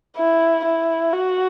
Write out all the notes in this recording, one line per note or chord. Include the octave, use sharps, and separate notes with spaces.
E4
E4
F#4